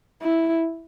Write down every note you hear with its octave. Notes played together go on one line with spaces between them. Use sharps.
E4